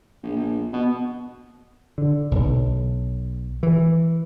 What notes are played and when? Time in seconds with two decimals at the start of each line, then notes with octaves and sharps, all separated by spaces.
0.23 A#1
0.36 A#1
0.73 B2
1.98 D3
2.31 B1
3.63 E3